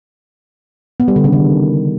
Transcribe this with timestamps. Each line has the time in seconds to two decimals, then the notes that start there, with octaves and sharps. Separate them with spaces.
1.00 B3
1.08 G3
1.16 D3
1.24 C#3
1.32 D#3